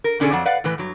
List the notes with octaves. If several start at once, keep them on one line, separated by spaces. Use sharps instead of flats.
A#4
B2 D3 C#4 D4 G#4 A4
F2 F#3 D5 F#5 A5
B4 D5 F5 F#5
A2 E3 B4
G2 F#3